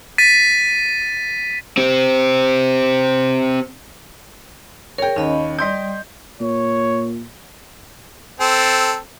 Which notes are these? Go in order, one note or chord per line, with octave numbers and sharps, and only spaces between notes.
A6 B6 D#7
C4 G4
G#4 A#4 C#5 G5
D#2 C#4 D#5 B5
G3 D5 D#5 C6 G6
A#2 C#5
C4 A4